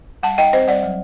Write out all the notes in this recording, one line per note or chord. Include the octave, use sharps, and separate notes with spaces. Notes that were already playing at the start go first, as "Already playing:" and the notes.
G3 F#5 A5
D#4 D#5 G5
C4 C5 D#5
G3 D5 F#5
F#3